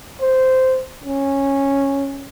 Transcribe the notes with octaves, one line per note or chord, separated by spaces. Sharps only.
C5
C#4